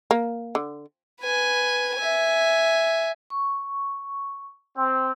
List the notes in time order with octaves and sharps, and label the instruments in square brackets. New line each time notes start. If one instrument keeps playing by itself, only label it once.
[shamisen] A#3
D3
[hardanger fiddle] B4 G#5
E5 G#5
[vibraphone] C#6
[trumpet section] C4